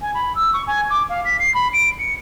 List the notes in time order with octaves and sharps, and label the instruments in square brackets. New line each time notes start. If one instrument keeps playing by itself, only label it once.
[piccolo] G#5
B5
E6
C#6
G#5
D6
F5
B6
C7
B5
D7
C#7